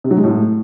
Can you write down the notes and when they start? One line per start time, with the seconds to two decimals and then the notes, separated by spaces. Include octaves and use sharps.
0.04 C3
0.11 F#3
0.17 G#3
0.24 A2